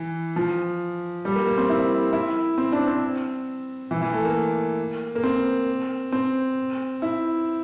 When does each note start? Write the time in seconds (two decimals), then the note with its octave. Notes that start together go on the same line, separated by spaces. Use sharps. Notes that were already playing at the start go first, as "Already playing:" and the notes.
Already playing: E3
0.36 F3
1.25 G3
1.35 A#3
1.47 A#3
1.58 C4
1.69 E4
2.13 E4
2.58 C4
2.72 D4
2.87 C4
3.91 E3
4.02 E3
4.13 A3
4.25 A#3
5.15 A#3
5.24 C4
6.12 C4
7.02 E4